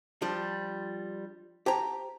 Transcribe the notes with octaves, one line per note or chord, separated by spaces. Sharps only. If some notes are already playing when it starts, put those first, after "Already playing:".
F3 G3 D4
G4 C5 G5 A5 A#5